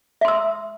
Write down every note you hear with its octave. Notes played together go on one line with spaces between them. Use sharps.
E5 C6 E6